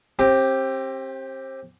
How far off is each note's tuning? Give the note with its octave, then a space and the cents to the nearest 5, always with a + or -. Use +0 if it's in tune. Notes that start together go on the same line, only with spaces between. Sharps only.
C4 +30 G4 +0